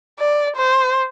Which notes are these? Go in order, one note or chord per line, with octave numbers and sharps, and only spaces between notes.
D5
C5